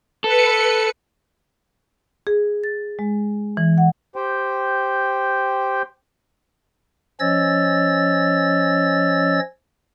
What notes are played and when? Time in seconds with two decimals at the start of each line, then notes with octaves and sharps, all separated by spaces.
0.24 A4 B4 C#7
2.27 G#4
2.64 A6
2.99 G#3
3.57 E3
3.78 F#5
4.16 G4 C5 G5
7.20 F3 C#4 C#5 D#5 E6 A6